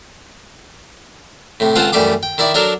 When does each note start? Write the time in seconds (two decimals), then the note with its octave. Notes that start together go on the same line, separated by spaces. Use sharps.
1.60 A2 C3
1.76 C#2 C4 F4 A4 C5 F#5
1.92 F#2 E3 G3 A3 C6 D6
2.23 G5
2.38 D#3 E4 D5 E5
2.54 F#3 D4 A4 A#4